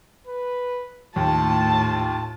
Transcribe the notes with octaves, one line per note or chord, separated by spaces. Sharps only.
B4
D#2 A2 F4 A5